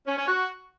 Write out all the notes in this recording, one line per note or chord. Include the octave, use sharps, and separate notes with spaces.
C#4
C#4
F#4